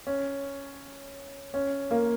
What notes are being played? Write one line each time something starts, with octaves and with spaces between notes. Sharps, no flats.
C#4
C#4
A#3